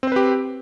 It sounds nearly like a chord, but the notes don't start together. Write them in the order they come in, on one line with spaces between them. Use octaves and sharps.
C4 C5 B4 G4